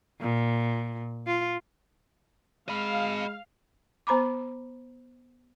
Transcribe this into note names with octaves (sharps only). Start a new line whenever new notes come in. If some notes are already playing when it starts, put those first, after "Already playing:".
A#2
F4
G#3 D#5 F5 B5
B3 C5 A#5 B5 D6